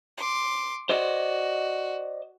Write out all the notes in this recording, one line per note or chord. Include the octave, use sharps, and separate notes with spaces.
C6 D6
F#4 C5 D5 D#5